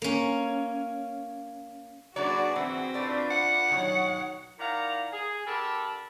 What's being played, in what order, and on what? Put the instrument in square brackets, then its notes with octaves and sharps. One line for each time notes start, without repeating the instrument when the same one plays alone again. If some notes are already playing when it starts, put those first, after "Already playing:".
[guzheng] A#3 C#4
[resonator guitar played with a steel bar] F#3 A#3 D4 [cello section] F#4 G#4 B4 [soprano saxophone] D5
[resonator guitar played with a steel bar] E3 [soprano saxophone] C4
[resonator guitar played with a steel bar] A3 D5 [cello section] D4 F4 B4
[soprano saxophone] F#5
[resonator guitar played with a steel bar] B2 D#3 [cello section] F#3 C#5
[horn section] D#3 E4 D5 F5 F#5 A#5
G#4
D3 G4 A4 A#4 A5 B5